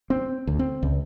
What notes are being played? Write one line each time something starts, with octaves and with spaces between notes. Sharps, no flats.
C4
D2
C4
C#2